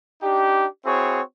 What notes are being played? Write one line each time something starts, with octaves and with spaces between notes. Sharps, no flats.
D4 D#4 G4
C4 E4 F#4 G#4 C#5